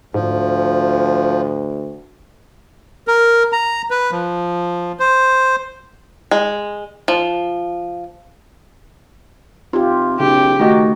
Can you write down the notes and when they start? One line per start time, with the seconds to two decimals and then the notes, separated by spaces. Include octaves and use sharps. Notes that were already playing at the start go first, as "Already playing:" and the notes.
0.14 D2 G#2 F3
3.08 A#4
3.53 A#5
3.91 B4
4.11 F3
5.00 C5
6.31 G#3
7.08 F3
9.73 C3 D#4 F4 G4
10.20 B1 C#3 G4
10.60 D#3 A3 D#4 F#4 D#5 A#6